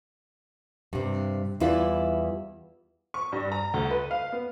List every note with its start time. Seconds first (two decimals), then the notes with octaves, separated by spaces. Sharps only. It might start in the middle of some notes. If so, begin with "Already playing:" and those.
0.93 G2 C3
1.60 E2 G3 E4 F4 B4 D5
3.14 C#6
3.32 G2
3.52 A#5
3.74 D2
3.90 B4
4.11 F5
4.32 B3